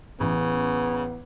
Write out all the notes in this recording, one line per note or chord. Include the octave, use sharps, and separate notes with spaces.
A1 C#3 B3